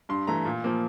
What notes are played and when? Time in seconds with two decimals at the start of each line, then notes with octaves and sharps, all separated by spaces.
0.09 G2 C6
0.27 E3 A3 A#5
0.45 A#2
0.64 F3 A#3